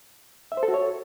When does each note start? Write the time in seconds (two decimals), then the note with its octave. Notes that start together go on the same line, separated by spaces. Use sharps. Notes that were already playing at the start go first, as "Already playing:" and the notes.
0.52 E5
0.57 C5
0.63 A4
0.68 F#4
0.74 C#5